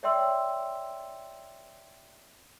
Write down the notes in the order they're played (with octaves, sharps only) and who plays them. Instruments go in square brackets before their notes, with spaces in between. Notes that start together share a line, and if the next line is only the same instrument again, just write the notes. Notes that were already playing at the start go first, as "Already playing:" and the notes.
[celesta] C#5 D5 E5 G5 C6 E6